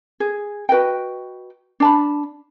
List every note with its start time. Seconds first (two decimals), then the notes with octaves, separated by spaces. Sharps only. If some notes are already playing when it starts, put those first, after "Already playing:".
0.20 G#4
0.69 F#4 B4 D#5 G5
1.80 D4 A5 B5